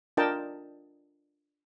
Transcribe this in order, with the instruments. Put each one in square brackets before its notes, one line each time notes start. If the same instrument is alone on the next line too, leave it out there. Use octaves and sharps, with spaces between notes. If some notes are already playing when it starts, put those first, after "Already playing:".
[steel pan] D4 F4 A#4 D#5 G5 A5